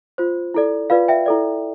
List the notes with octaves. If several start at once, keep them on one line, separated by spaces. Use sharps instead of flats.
F4 C5
E4 A4 D5
F4 B4 D5 F5
E5 G5
E4 A4 D5